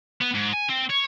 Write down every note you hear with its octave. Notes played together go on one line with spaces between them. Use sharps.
B3
G#2
G#5
C4
C#5